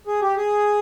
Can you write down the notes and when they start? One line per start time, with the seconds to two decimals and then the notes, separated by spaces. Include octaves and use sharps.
0.07 G#4
0.22 G4
0.36 G#4